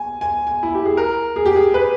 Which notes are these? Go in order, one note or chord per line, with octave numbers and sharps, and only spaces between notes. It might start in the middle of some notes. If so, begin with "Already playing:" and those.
Already playing: G#5
G#5
G#5
E4
G4
G#4
A#4
G#4
G4
G#4
B4